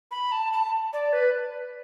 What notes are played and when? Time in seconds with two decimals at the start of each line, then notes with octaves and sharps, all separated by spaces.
0.11 B5
0.32 A5
0.53 A5
0.93 D5
1.13 B4